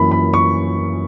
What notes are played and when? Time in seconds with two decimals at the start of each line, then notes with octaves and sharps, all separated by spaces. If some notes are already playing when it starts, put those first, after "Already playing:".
Already playing: F#2 E3 A#3 C#4 B5
0.11 B5
0.34 C#6